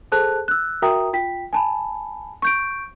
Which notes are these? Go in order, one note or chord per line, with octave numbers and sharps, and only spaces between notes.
G#4 A4 C5 A5 F#6
E6 F#6
F#4 A#4 E5 G5 A#5 D#6
F4 G5 B6
G#5 A5 B5
C#6 G6 D7